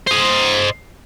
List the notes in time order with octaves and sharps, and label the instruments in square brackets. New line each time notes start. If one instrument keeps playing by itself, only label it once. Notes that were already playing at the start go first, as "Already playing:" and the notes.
[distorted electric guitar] C5 D#5